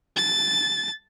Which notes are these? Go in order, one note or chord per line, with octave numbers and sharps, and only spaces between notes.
A6